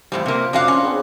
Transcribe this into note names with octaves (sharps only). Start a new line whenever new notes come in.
E2 A2 F3 G3
C3 A#3
F2 D4 F4 F#4 F5
C#4
C#3 B3 C4